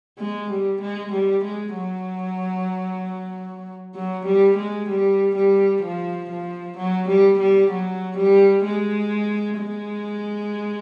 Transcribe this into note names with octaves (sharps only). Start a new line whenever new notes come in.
G#3
G3
G#3
G3
G#3
F#3
F#3
G3
G#3
G3
G3
F3
F3
F#3
G3
G3
F#3
G3
G#3
G#3